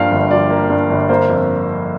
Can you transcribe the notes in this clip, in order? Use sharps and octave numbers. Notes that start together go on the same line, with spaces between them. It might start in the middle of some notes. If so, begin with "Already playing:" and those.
Already playing: G2 F3 A#3 F5 G5
G1
F3 D5
A#3
G2
G1
A#3 C5
F2